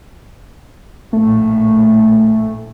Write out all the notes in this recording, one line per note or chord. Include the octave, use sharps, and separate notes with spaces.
A#1 A2 A3